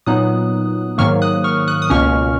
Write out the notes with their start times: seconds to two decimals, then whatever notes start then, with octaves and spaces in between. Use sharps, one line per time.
0.06 A#2 F#3 B3 D#4 D#6 F#6
0.98 G#2 D#3 F#3 A#3 C#6 F6
1.22 D#6 F#6
1.44 C#6 F6
1.68 D#6 F#6
1.82 D#6
1.90 C#2 B2 A#3 C#4 C#6 F6